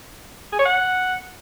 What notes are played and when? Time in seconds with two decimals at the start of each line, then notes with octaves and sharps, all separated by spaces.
0.53 G#4
0.59 C#5
0.66 F#5